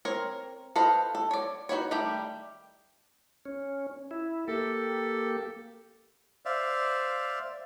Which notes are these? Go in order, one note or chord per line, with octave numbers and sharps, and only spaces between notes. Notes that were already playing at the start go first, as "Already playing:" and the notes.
C4 A#4 C#5
A4 B4 C5 D#5 F5
A4
C#5 D5
D#4 F#4 B4 C#5
D#3 G3 A3 G4
C#4
E4
A#3 G4 A4
C5 D5 E5 F5